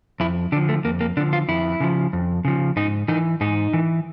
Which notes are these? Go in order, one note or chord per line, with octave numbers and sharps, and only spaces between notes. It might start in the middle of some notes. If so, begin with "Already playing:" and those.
F2 E4
D3 F3 D4
A3
F2 A#3
A#3
D3 F3 D4
F4
F2 E4
C#3 F3
F2
C#3 F3
G#2 D#4
E3 D#4
G#2 D#4
E3